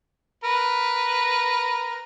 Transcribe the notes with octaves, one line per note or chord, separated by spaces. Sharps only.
A#4 B4